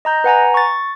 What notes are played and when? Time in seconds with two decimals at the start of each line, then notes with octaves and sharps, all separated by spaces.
0.05 D#5 A#5 G6
0.24 B4 F#5 G#5 A#5
0.54 C#6 A6